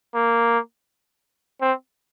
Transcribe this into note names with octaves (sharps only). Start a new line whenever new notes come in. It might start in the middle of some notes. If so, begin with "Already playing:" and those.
A#3
C4